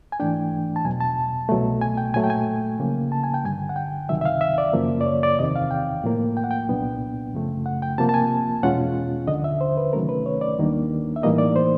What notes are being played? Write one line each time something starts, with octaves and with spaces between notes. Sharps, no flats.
G#5
G#2 E3 A3 D4 G5
A5
E2 B2 F#3 G#5
A5
C2 B2 F#3 A3
G#5
G5
A#2 F#3 A3 G#5
G5
G#5
C#3 F3 A#3
A5
G#5
G5
G2 D3 G3 G#5
F#5
G5
C#2 C3 D#3 F#3 E5
E5
F5
E5
D5
F#2 C#3 F3 A#3
D5
C#5
D5
E2 C3 D#3 D#5
F5
G5
A2 F3 A#3
G5
F#5
G5
C2 A#2 F#3 B3 D4
F#2 C#3 F3 A3
F#5
G5
C3 F3 A#3 A5
A5
G#5
E2 B2 G#3 C#4 F4 F#5
D#2 D3 F3 D#5
E5
C5
B4
C3 D#3 F#3 A3 C#4 A#4
B4
C#5
D5
D#2 D#3 G3 A#3 D4
E5
A2 E3 G3 A#3 D#4 D#5
D5
C5